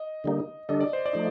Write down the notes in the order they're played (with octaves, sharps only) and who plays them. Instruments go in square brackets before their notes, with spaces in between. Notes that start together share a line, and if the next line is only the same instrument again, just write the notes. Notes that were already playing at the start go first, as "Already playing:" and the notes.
Already playing: [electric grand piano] D#5
[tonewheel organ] D3 G3 A#3 D#4
[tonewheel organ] D3 G3 D4 A4 [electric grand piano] D#5
[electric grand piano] D5
C5
D5
[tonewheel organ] F3 A3 D#4